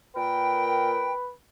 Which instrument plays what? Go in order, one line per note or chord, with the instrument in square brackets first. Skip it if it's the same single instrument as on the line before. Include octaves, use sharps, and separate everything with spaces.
[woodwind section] A#2 A#4 G5 [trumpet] B4